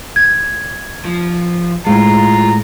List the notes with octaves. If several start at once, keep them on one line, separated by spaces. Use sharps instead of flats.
G#6
F3
A2 G#3 F4 A#5